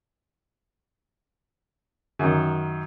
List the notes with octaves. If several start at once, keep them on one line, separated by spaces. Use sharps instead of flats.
F#2 D#3